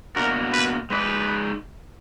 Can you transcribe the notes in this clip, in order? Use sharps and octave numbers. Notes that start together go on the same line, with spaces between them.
B2 A#3 D4 F#4 A#4
B4
G#3 D#4 G#4 B4 D5